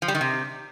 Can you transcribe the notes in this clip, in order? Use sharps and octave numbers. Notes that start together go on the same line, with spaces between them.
F3
G3
D#3
C3